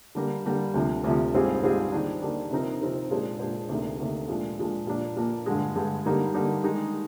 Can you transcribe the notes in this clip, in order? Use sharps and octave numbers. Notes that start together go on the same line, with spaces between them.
D3 G3 A#3
D3 G3 A#3
D2 C3 F3
D2 C3 F3
G#2 G3 C4 F4 G#4
G#2 G3 C4 F4 G#4
D#3 A#3 D4
D#3 A#3 D4
C3 F3 C4 D#4 A#4
C3 F3 C4 D#4 A#4
A#2 G#3 D4 G#4 C5
A#2 G#3 D4 G#4 C5
D2 C3 D#3 A#3
D2 C3 D#3 A#3
A#2 F3 G#3 D4
A#2 F3 G#3 D4
A#2 F3 A#3 D4
A#2 F3 A#3 D4
G2 D3 G#3
G2 D3 G#3
D3 G3 A#3 D#4 G4
D3 G3 A#3 D#4 G4
D#3 G#3 D#4